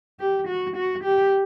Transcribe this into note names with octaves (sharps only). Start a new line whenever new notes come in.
G4
F#4
F#4
G4